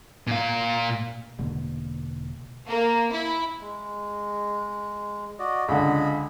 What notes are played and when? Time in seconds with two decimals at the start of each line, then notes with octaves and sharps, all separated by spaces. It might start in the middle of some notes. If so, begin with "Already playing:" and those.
0.27 A#2 F5
1.38 E1 B2 D3 A#3
2.67 A#3
3.11 E4
3.60 G#3
5.39 F#4 D5 D#5
5.68 C#2 D3 D#5 B5